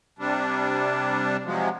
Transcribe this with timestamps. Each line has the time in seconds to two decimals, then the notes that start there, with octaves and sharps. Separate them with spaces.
0.19 C3 G3 D4
1.45 C3 F3 F#3 G#3